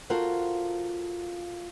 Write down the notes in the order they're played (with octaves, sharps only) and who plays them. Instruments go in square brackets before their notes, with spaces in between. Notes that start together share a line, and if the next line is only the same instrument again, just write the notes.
[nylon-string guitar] F4 F#4 A4 A#4 C5 F#5